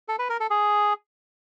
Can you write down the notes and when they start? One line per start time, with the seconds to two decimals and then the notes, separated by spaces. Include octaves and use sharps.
0.08 A4
0.19 B4
0.29 A#4
0.40 A4
0.50 G#4